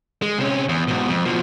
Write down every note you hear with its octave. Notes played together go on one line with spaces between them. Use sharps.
G#3
C3 C#4
E2
G#2 B2
F2
B2 F3